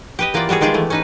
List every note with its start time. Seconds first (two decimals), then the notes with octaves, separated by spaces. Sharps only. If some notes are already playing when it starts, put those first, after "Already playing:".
0.19 G4 B4 D#5
0.34 E3 A#3 B3 F4 D5
0.49 G3 B3 F#4 G#4
0.61 D#3 G#3 F4 G4 G#4 D5
0.74 E3 A3
0.90 C#4 D#4 B4